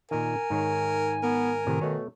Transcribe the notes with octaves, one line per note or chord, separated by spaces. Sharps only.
A#2 D#3 A#4 G#5
G#2 D#3 C#5
B3 A#4
A2 C3 D#3
B2 A3 C#5